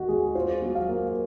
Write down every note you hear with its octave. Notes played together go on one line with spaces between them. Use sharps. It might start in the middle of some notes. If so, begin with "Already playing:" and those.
Already playing: D#2 D#3 F#4
G#3 G#4
F4 C5
F#3
F5
A#3